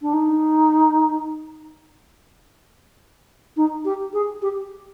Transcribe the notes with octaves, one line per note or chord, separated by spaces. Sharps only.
D4
D#4
D#4
G4
G#4
G4